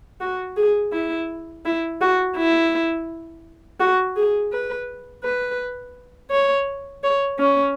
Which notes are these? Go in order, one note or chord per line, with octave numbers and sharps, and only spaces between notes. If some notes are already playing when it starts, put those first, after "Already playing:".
F#4
G#4
E4
E4
F#4
E4
F#4
G#4
B4
B4
C#5
C#5
C#4